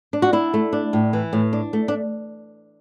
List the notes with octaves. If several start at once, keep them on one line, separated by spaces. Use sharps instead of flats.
D4
F#4
D4 E4
A3
D4
A2
E3
A2
D4
A3
D4